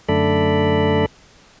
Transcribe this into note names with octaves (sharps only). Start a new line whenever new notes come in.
F#2 D3 A3 A4 D5 B5